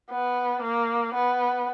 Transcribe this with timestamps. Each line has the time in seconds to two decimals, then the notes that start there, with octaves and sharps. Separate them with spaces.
0.10 B3
0.62 A#3
1.14 B3